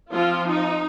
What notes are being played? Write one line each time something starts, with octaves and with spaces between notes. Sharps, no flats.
F3 C4 F4
D#4